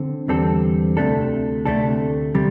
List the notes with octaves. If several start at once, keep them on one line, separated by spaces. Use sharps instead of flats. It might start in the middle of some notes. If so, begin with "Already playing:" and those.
Already playing: D3 C4 A4
E2 D3 G3 C4 A4
D2 C3 A3 D4 A4
D2 C3 A3 D4 A4
C3 G3